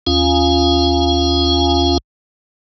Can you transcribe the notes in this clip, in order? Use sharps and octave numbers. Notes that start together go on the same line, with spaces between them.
D#2 C#4 F4 F5 G#5